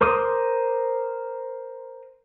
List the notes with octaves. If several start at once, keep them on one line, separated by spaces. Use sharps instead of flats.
A#4 C5 C6 D6 D#6